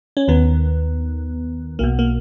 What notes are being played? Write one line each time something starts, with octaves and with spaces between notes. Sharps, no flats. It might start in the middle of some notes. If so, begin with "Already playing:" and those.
C#4
D#2 D#3 B3
B1 B2 A#3
A#3